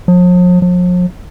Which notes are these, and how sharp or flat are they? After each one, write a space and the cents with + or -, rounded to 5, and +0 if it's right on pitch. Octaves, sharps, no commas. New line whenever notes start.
F3 +45
F3 +45